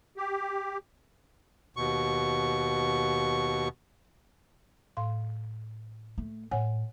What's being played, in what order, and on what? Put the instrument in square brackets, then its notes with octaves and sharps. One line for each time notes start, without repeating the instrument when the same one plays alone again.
[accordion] G4
[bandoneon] D#2 B2 C#6
[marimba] A2 F5 C6
[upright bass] A3
[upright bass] A2 [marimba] C#5 F#5 G#5